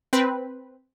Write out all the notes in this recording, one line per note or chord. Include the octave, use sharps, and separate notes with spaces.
C4 B4